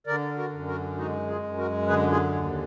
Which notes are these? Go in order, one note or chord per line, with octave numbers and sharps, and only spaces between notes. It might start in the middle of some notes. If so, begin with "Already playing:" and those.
D3 A#4 D5
F#4 A#4
F#2
F#4 A#4
G#3 D#4 F#4
F4 G#4
F#2
F#4 A#4
D3 G#4 B4
F4 G#4
D#2